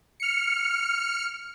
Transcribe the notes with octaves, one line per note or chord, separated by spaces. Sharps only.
F6 C#7